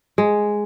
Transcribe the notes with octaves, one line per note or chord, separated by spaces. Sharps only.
G#3